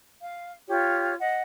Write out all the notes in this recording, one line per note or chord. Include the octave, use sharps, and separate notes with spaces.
F5
F4 G4 C#5
D#5 F#5